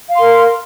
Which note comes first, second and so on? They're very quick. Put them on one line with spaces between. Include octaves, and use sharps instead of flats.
F5 C6 A#4